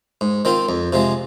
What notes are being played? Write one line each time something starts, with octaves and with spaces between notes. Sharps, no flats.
G#2
D#3 C4 F4
F2
C3 F3 G#3